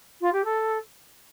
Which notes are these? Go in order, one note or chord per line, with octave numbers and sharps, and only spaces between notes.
F4
G4
A4